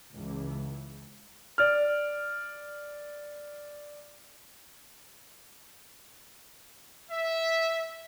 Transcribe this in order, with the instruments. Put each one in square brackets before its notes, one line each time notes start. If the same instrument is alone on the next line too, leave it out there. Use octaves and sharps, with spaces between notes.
[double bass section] C#2 E3
[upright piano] D5 F6
[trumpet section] E5